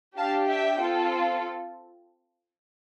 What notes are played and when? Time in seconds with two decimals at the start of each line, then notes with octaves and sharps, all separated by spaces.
0.17 D4 G4 F5 A5
0.49 E5 G5
0.81 C4 F4 A4